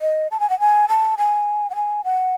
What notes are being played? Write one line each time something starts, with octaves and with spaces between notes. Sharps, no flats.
D#5
A5
G#5
F#5
G#5
A5
G#5
F#5
G#5
F#5